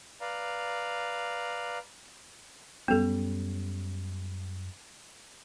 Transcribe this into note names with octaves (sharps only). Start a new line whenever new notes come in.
B4 D5 F5 A#5
F#2 G3 B3 C#4 A4